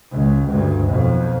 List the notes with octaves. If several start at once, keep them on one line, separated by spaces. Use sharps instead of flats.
C#2
D2 G2
B1 F2